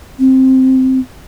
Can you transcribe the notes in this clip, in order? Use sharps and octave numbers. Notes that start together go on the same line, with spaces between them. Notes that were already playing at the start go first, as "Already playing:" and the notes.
C4